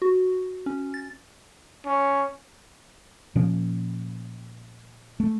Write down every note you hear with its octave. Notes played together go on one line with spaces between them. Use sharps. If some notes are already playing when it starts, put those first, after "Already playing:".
F#4
C#4
A6
C#4
A#2 F3 C#4
A3